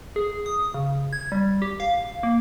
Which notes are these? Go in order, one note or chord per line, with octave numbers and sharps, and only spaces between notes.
G#4
D#6
C#3
G#6
G3
G4
F5
A#3